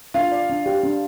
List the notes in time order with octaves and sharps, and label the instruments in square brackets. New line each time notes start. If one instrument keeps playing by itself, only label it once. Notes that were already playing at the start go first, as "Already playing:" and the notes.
[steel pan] D4 [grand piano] F4 F5
[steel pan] D5
D4
G4
D4